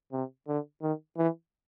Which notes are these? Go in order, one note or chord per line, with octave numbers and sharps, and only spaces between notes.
C3
D3
D#3
E3